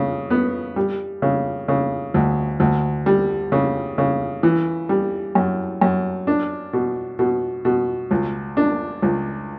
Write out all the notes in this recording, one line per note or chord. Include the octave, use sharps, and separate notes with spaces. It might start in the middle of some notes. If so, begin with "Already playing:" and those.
Already playing: C#3
B3
G3
C#3
C#3
D2
D2
G3
C#3
C#3
E3
G3
F#2
F#2
D4
B2
B2
B2
C#2
D4
C#2